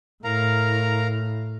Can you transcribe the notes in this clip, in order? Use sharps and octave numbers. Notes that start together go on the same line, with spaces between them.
A2 A#4 F5 A#5